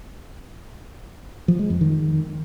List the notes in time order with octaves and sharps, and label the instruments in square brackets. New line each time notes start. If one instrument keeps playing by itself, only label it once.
[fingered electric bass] F3
G#3
F2
D#3